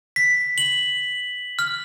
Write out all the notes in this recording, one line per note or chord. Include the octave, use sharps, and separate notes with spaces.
B6
F#7
F6